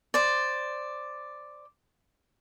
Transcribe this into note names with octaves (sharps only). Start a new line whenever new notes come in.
C5 D5